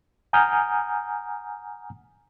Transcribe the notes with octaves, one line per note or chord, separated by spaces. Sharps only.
F#5 G#5 A#5 D#6 F6 G6